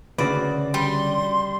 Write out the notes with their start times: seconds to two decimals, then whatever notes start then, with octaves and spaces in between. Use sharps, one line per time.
0.18 D2 C#3 F#4 B4 D5
0.74 G3 C6